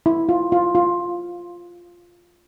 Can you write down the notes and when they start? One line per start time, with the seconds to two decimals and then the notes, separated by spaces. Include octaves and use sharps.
0.06 E4
0.29 F4
0.52 F4
0.75 F4